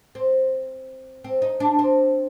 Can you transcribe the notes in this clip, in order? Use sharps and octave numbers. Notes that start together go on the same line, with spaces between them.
C4
C4
D#4
D4
C4